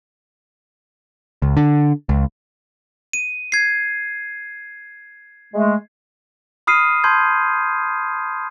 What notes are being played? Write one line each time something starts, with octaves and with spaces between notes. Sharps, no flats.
C#2
D3
C#2
D#7
G#6 C7
G#3 A3
B5 D#6 F6 C7 D#7
A5 B5 C6 G6 G#6